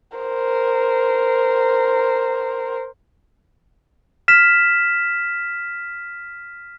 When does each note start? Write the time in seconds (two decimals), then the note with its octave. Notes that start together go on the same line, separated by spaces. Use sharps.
0.17 A#4 C5
4.28 F6 B6 E7